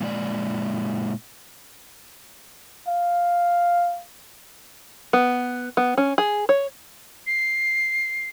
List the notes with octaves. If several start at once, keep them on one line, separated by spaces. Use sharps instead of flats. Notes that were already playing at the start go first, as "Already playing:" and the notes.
A#2 G#3 D5
F5
B3
B3
C#4
G#4
C#5
C7